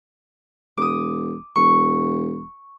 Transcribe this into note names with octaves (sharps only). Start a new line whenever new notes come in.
E1 D6 D#6
E1 C#6